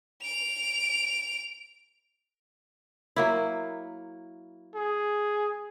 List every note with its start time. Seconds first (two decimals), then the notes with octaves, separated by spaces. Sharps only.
0.21 D7 F7
3.16 F#3 A#3 E4
4.75 G#4